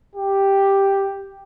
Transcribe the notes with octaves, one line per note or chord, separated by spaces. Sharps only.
G4